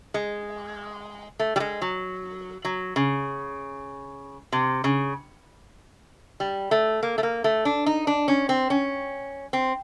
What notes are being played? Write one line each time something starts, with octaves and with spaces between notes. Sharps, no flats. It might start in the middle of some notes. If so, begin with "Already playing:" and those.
G#3
A3
G3
G#3
F#3
F#3
C#3
C3
C#3
G3
A3
A#3
A3
A#3
A3
D4
D#4
D4
C#4
C4
C#4
C4